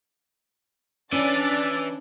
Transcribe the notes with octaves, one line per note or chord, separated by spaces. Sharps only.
E3 C#4 D4 D5 A6